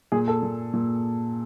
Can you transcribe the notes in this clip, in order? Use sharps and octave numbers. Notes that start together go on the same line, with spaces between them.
A#2 G#4
A4
A#2
A#2